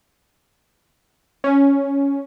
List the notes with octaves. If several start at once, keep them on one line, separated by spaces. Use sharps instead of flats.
C#4